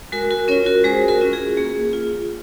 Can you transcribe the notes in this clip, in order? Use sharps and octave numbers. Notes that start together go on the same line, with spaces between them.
G#3 F#4 A#4
F#4 A#4
C#4 F4 A#4 C#5
F#4 A#4
G#3 G#4 C5
F#4 A#4
C#4 F4
G#4
A#3 G#4
F4